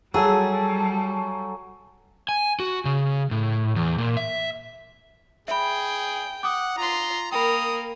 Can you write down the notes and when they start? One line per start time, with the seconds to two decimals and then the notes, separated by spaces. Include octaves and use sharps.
0.14 F#3 G3 G#4 A4 G#5 A5
2.29 G#5
2.60 F#4
2.85 C#3
3.31 A2
3.76 E2
3.98 A#2
4.17 E5
5.48 G#4 E5 G5 B5
6.43 F#5 D6 D#6
6.78 F4 A#5 C6
7.32 A#3 A#4 G5 B5 D#6